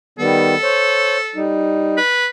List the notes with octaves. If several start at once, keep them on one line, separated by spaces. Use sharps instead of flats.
D#3 G3 B3 A4
C5 C#5
G3 D#4
B4